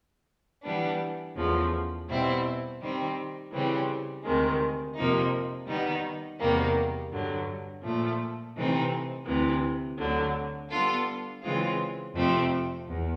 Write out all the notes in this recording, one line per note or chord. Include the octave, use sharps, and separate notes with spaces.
E3 G3 B3 D4
E2 C#3 F3 A3
B2 G3 C4 E4
D#3 G3 C4
C#3 E3 G3 C4
D2 C3 D#3 G#3
F2 C3 F3 A#3 D#4
D#3 G3 B3 D#4
E2 C3 D#3 G3 A#3
G2 D3 F#3
A#2 F3 A3
C3 E3 A3 C4 D#4
D2 C3 E3
D2 D3 F#3
G3 B3 D4 F4 A4
C#3 E3 G#3 C4 F4
F2 C3 F3 A3 C4
E2